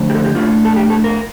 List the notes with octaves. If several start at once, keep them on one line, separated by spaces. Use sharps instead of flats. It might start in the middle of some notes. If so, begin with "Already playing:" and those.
Already playing: F2 D3 A3 D4
G4
A4
G4
A2 A3 D4 F4
A4
G4
A4
A#4